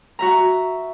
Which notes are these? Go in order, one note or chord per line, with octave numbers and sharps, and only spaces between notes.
F#4 E5 A#5